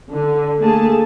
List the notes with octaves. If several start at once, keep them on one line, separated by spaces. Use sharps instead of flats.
D3
A3 A#3 G#4 A5